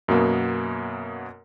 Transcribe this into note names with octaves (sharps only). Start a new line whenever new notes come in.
F#2 B2 A#3 B3